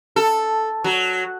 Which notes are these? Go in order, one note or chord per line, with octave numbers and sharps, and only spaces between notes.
A4
F#3